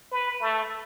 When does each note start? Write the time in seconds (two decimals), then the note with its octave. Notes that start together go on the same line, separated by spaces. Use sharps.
0.12 B4
0.41 A3